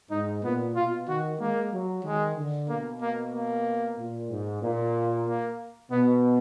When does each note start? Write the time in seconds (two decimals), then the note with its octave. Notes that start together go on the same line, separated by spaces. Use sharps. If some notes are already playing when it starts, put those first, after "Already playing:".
0.11 G#2 D#4
0.43 A#2 B3
0.76 B2 F4
1.08 D#3 F#4
1.40 G#3 A#3
1.73 F#3
2.04 D#3 G#3
2.37 D3
2.68 B2 A#3
3.02 A#3
3.33 A#3
3.97 A#2
4.29 G#2
4.62 A#2
5.26 A#3
5.91 B2 B3